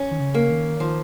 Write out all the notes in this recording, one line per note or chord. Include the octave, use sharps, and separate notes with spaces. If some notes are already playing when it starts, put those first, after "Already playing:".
Already playing: C#4
D#3
C#3
A#3
D#3
D#3 F3